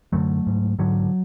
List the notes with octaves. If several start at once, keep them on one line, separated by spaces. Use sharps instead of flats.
F#2 D3 F#3 A3
G#2
G#2 D3 F#3